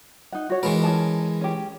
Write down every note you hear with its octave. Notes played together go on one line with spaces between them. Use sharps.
D#4 F#5
F#4 C#5
E3 G#3 A#4 B4
C#4 G#4 A5
C#4 G4